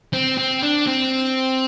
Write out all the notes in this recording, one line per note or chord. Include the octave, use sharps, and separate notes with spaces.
C4
C4
D4
C4